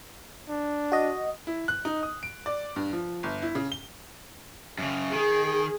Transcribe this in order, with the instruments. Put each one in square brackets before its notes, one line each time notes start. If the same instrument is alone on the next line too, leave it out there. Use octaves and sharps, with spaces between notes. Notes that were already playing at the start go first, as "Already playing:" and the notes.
[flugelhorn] D4
[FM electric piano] F#4 D#5
[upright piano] E4
F#6
D#4
D#6
D7
D5
G2
F3
G1
E4
C#3
G7
[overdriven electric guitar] F#2 C#3
[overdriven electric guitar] D#3 [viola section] G#4